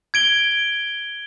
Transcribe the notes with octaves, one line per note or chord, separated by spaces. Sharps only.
G#6 D7 G7